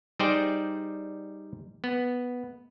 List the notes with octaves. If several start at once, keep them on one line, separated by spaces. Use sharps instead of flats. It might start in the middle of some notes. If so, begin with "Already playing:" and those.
G3 D#4 G#4 C5 D5 G5
B3